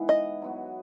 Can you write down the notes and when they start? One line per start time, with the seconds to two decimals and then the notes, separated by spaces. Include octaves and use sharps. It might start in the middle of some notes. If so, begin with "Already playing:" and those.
Already playing: G#2 E3 B3 E4 B4
0.09 D#5
0.42 F#3 B3 F#4